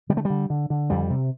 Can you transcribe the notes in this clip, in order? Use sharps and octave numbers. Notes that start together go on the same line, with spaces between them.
D3 G3
A3
G3
D3
D3
D3
F2 G3
C3